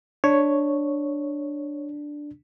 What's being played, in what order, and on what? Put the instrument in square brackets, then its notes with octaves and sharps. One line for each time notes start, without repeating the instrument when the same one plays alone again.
[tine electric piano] D4 [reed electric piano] C#5